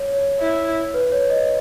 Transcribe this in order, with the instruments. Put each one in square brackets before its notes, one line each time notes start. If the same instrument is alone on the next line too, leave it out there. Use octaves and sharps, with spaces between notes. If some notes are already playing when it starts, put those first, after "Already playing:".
Already playing: [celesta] C#5
C#5
[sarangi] E4
[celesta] B4
C#5
D#5